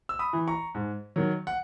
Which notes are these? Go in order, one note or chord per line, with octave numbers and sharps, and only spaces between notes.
E6
B5 D#6
E3
A#5 C#6
G#2
D#3 F#3
F#5